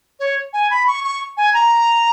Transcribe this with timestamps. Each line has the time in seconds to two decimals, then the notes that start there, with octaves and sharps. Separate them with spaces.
0.20 C#5
0.53 G#5
0.71 B5
0.87 C#6
1.04 C#6
1.37 G#5
1.54 A#5